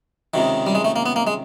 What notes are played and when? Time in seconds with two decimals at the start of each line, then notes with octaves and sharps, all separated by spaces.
0.34 C#2 C3 D#3
0.67 G3
0.75 G#3
0.85 A3
0.96 A#3
1.06 B3
1.16 A#3
1.27 G#3